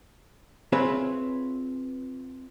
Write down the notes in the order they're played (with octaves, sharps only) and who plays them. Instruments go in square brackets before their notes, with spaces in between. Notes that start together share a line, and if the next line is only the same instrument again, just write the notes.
[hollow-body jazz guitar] C4 F4 G#4 B4 C#5 E5